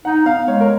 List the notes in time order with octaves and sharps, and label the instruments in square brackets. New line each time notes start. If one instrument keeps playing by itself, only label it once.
[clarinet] D#4 [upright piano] F#5
[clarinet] B3 [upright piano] F5
[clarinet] G#3 [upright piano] C#5
[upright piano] A#4